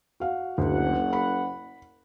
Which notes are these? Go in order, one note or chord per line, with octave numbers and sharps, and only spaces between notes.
F#4 F5 F#5
F#1 D2 F#5
B5